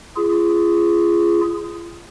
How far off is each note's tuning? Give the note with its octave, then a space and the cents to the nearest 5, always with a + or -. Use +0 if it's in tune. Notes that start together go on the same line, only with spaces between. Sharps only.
F4 -35 G#4 +0